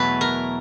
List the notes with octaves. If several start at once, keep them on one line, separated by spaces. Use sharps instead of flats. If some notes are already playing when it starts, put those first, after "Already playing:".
Already playing: E2 B2 F#3 A3 B4
A#4